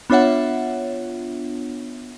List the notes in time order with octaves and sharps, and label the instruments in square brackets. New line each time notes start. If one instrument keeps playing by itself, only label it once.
[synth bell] B3 D4 F4 C#5 E5 F#5